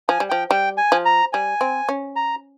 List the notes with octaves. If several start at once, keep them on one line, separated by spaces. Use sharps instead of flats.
F3 G#5
G3
F3 G5
G3 G5
G#5
F3
A#5
G3 G#5
C4
C#4
A#5